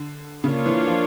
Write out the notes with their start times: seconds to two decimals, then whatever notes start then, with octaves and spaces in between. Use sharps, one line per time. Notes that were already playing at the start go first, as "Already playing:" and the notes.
Already playing: D3
0.44 C#3 A#3 D4 F4 C#5
0.66 E3
0.87 F3